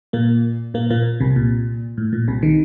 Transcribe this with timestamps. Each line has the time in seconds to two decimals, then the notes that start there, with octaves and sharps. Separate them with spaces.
0.13 A#2 A#3
0.74 A#2 A#3
0.90 A#2 A#3
1.20 C2 C3
1.36 A#2
1.98 A2
2.13 A#2
2.28 C2 C3
2.43 D#3